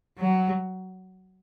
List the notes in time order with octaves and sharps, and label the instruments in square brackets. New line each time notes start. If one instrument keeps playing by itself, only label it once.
[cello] F#3